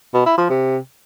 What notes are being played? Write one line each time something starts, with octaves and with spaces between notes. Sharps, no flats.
B2
E4
F3
C3